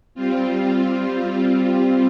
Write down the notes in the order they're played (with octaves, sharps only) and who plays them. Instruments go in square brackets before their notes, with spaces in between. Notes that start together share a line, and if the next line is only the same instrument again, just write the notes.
[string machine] G3 C4 F4